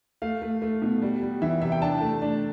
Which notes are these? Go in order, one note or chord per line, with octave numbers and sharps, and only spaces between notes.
A3 F5
A3
A3
B2
G3
G3
E3 E5
C3 E5
G5
D4 A5
A3
D4